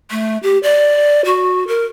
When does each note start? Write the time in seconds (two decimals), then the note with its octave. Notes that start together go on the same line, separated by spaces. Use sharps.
0.11 A3
0.43 G4
0.63 D5
1.25 F#4
1.68 A#4